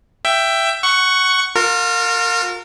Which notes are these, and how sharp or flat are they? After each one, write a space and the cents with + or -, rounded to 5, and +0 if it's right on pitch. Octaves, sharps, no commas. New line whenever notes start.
E5 +15 G5 +0
F#5 +15 C#6 +0
F4 +35 A#4 -25